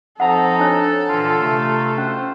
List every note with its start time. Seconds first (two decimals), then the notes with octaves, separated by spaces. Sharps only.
0.20 F3 C4 D#4 A4 F#5 A#5
0.59 D4 C#5
1.09 A#2 D3 E3 F4
1.40 C3 A3
1.98 C#4 C5